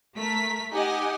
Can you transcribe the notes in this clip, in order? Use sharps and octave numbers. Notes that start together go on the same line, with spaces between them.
A3 A#4 B6
D#4 G4 D#5 F#5 G#5